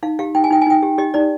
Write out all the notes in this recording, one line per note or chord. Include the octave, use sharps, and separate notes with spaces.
D#4 F5
G4 F5
D#4 G5
G#5
D#4 G5
G#5
D#4 G5
G4
G4 D#5
D#4 D5